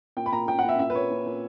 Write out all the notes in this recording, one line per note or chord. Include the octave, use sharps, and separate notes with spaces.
A#2 G5
B5
A#2 A#5
A#2 G5
A#2 F#5
E5
A#2 E5
B4
A#2 C#5
A#2
A#2